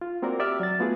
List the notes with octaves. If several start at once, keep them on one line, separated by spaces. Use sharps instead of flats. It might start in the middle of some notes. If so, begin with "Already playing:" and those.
F4
A#3 C4 F#4 A#4 D5
G4 D5 E5 D6 E6 F6
F#3 A6
A3 B3 F4 F#4 G#4